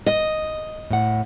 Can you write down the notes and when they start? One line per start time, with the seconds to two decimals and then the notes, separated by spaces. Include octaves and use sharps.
0.06 D#5
0.91 A2 F#5